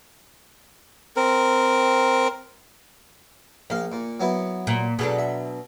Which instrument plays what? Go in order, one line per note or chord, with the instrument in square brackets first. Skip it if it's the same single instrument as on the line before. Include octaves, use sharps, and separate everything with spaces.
[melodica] C4 A#4
[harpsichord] A#1 F5 [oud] A#3
[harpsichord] A#2
F#3 B3 E4
[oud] A#2
[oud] B2 F#3 D4 [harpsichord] G#4 A4
[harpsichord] E5